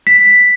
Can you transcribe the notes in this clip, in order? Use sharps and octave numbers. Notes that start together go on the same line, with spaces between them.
B6